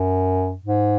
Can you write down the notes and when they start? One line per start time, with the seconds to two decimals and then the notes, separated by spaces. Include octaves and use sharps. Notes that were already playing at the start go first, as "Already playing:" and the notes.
Already playing: F#2
0.64 G#2